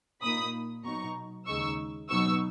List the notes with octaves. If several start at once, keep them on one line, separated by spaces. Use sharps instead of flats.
A#2 A#3 D#4 B5 D#6
B2 F#3 B3 D#4 A#5 C#6
D#2 C#3 G#3 D#4 C#6 E6
B2 F#3 B3 D#4 C#6 E6